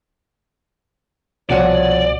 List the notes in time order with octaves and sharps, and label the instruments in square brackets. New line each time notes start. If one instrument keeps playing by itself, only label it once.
[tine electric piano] C2 B2 [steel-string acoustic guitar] F3 F#5 G#5 [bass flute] C#5 [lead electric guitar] D5